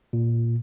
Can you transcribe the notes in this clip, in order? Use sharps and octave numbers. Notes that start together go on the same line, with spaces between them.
A#2